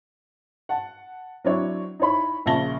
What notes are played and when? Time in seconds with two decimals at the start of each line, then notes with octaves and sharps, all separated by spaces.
0.69 F#5 A5
1.44 F#3 C4 D4 E4 C#5
2.00 D#4 E4 C#5 B5
2.46 A#1 A#2 C#3 A5 A#6 G7